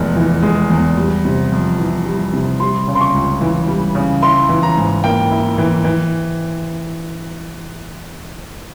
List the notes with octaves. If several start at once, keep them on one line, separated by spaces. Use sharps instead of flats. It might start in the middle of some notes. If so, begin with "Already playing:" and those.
Already playing: F1 E2 G#3
E3
G#3
E2
G3
C3
F2
E3
G3
C3
G3 C6
C#3
C6
C#6
C#2
E3
G3
C#3
E4 C6
E3
A#5
G#2
A#3 G5
E4
E3
E3